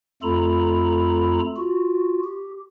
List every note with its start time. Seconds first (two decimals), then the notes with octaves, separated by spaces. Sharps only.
0.22 F2 A3 F4 A4 A#5 B5
1.56 F4 F#4
2.24 G4